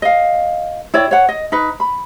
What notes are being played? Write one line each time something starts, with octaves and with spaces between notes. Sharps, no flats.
D#5 F5
E4 C#5 D5 G5
C#5 F#5
D#5
D#4 B4
B5